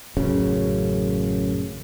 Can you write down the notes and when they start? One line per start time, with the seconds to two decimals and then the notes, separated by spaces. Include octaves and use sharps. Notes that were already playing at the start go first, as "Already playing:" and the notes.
0.17 A1 F#2 C#3